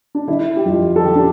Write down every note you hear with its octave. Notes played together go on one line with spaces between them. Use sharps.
D4
D3 E4
G4
F2 F4
A4
D3 G4
D4